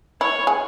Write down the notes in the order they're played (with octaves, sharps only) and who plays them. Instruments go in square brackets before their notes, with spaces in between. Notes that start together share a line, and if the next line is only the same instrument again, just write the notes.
[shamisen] E4 [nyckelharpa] C#5
[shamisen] G#4